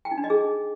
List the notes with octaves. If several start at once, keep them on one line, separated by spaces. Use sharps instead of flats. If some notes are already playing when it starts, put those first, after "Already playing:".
G5
D#4
D4
D#5
G#4